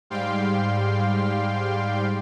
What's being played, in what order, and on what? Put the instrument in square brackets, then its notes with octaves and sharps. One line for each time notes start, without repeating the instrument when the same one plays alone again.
[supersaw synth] G#2 G3 F5 G5 C6